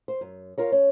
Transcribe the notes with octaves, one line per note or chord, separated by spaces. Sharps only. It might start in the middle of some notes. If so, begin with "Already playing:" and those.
C5
F#2
F4 A#4 C#5
C#4